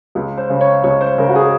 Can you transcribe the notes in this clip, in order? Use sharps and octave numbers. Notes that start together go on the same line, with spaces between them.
C#2
C5
C#3
C#5
C#2 C#5
C5
C#3 A#4
F#4
G#4